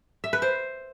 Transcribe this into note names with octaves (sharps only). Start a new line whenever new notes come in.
E5
B4
C5